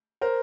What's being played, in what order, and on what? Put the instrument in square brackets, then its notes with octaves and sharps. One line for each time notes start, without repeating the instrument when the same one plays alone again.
[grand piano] A#4 C5